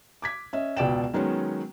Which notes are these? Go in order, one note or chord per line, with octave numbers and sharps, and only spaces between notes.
D6 G#6 B6
C#4 D#5 E5
E1 C#2 B2 D5 G5 E7
D#3 F#3 G#3 B3 C#4